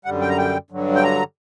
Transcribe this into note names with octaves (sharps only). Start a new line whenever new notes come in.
F#2 D3 G3 F#5
G5
A#5
G5
G2 D3 F#3
G5
A#5